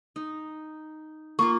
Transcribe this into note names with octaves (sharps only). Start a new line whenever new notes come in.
D#4
A#3 F4 C#6